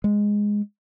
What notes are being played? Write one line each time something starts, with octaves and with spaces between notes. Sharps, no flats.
G#3